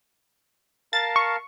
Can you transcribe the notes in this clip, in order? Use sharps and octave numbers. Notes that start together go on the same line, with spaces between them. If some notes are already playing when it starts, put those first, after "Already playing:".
A#4 F5 A5 A6
C#6